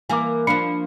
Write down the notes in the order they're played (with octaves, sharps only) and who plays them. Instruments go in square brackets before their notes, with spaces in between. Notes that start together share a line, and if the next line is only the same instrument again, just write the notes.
[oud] E3 A#3 A#4 [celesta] G#5 D6
[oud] F3 A#3 D4 [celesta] B5 C#7